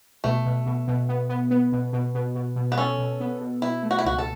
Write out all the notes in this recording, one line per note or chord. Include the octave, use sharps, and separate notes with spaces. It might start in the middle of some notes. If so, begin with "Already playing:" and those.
B2 A3
B2
B2
B2
B3
B3
B3
B2
B2
B2
B2
B2
B3
C#4 A4
B2
B3
B2
B2 E4
A3
F#4
E4
C#2 F#4
A4